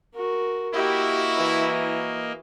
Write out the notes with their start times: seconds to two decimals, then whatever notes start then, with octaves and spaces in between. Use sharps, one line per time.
0.14 F#4 A#4
0.74 A#3 E4 F#4 G4 D#5
1.37 E3